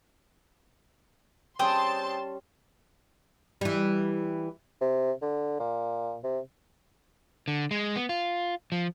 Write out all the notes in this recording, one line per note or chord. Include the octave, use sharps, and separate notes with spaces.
G3 C4 C#4 G#4 G5 A5 C6 D#6
E3 G3
C3
D3
A#2
C3
D3
G#3
B3
F4
F3